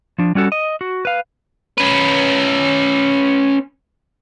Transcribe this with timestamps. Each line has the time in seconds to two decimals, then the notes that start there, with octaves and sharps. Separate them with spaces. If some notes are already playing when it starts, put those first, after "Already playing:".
0.18 F3 D4
0.35 G3 C#4 F#4 A4
0.52 D#5
0.81 F#4
1.05 B4 F5
1.78 C#4 B4